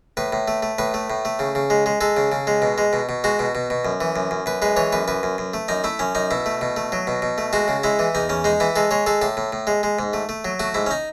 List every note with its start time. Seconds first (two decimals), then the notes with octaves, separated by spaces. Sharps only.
0.17 A2 B4
0.32 A2
0.48 A3
0.63 A3
0.78 A2 B4
0.94 A3
1.10 A2
1.25 A3
1.39 C#3
1.55 C#3
1.70 G#3
1.86 G#3
2.01 G#3 A4
2.17 C#3
2.32 C#3
2.47 G#3
2.62 B2
2.78 G#3
2.93 B2
3.09 B2
3.24 G#3 F#4
3.39 B2
3.55 B2
3.70 B2
3.85 F#2
4.01 E3
4.16 F#2
4.31 F#2
4.46 F#2 B4
4.62 G#3 B4
4.76 E3 C#5
4.93 F#2 B4
5.08 F#2 B4
5.23 F#2
5.38 F#2
5.54 A3
5.68 F#2 D#4
5.84 A3 E4
5.99 F#2 C#4
6.15 F#2 D#4
6.31 B2 E4
6.46 A3
6.61 B2
6.76 A3
6.92 F#3
7.07 B2
7.22 B2
7.38 A3
7.53 G#3 F#4
7.68 C#3
7.84 G#3 E4
7.99 E3
8.15 E2 D#4
8.29 E2 C#4
8.44 G#3 D#4
8.60 E3 E4
8.76 G#3 A4
8.91 G#3 C#5
9.06 G#3 A4
9.21 A2 A4
9.37 A2
9.52 A2
9.67 G#3
9.83 G#3
9.99 G#2
10.13 A3
10.29 A3
10.45 F#3
10.60 A3 F#4
10.74 G#2 E4
10.86 C#4
10.91 D#4